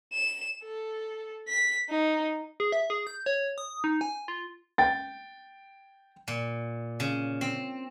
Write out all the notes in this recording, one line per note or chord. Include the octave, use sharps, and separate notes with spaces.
E7
A4
B6
D#4
G#4
E5
G#4
G6
C#5
D#6
D#4
G#5
F4
G5 A6
A#2
C#3
C4